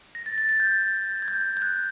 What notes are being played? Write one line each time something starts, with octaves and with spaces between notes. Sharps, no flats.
A#6
A6
A6
A6
G6
G#6
G6
G6
F#6